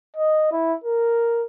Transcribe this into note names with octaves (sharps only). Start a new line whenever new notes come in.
D#5
E4
A#4